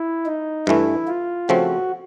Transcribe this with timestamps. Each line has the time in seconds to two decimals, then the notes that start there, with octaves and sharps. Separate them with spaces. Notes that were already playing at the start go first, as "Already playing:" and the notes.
Already playing: E4
0.26 D#4
0.67 G2 E3 A3 E4
1.08 F4
1.49 C#3 F3 A3 C4 F#4